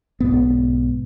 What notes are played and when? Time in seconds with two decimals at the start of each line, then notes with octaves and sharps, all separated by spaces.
0.20 B1 G#2 B3